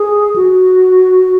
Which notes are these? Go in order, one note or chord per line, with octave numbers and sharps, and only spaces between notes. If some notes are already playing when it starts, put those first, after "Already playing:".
Already playing: G#4
F#4